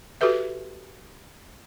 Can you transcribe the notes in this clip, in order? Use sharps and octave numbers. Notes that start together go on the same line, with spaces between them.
F#4 G4 A4 B4 E5